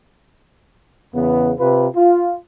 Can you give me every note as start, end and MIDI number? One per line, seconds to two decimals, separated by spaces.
1.15 1.54 40
1.15 1.54 49
1.15 1.54 59
1.59 1.88 48
1.59 1.88 65
1.59 1.88 71
1.96 2.37 65